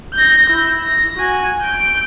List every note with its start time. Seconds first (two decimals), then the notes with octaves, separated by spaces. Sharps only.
0.14 G6 A#6
0.51 E4 G6
0.84 A#6
1.17 F#4 G#5
1.62 G6 D7